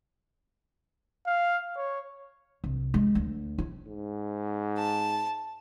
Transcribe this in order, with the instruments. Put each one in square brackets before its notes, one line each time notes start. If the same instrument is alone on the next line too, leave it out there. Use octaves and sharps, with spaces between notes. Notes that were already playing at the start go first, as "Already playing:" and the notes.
[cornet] F5
C#5
[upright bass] C2
G#3
D2
E4
[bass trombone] G#2
[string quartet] A5